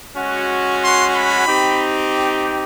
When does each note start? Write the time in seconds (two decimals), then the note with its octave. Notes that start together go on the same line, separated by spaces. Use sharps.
0.16 G#3 C#4 F#4
0.82 C6
1.14 B5
1.47 C4 D#4 G4